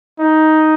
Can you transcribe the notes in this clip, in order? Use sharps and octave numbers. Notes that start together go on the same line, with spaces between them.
D#4